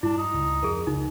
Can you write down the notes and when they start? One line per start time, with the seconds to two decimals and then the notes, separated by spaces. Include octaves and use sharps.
0.03 G2 G3 D4 E4
0.18 D#4
0.34 C#2
0.63 F2 G#4 A#4
0.87 C#2 D#4